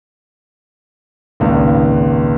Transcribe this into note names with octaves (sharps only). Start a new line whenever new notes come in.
G#1 C#2 A#2